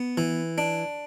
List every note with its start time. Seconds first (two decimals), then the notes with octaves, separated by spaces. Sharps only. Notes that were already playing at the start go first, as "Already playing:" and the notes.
Already playing: B3
0.18 E3
0.58 D4